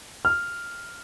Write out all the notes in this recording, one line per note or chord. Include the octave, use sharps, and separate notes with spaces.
F6